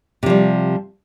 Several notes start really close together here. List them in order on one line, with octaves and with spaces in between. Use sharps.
C3 F3 G3